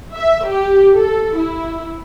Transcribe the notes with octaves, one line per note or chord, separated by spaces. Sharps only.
E5
G4
A4
E4